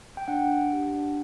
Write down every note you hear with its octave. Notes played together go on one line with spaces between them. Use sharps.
G5
D4 F#5
D4
G4
D4